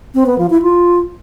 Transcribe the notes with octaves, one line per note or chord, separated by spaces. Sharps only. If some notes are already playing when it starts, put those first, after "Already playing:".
C4
B3
F3
E4
F4